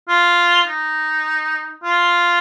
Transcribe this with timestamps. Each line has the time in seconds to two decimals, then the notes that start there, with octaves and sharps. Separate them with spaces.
0.08 F4
0.67 D#4
1.83 F4